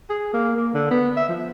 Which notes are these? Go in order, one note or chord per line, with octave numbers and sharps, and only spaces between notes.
G#4
A#3
A#3
D3
B3
E5
F3